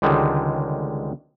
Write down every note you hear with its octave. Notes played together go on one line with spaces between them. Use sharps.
C#2 D3 D#3 G3 G#3